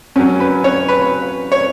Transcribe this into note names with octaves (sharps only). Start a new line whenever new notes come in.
F#2 F#3 C#4
B4
C#5
B4
C#5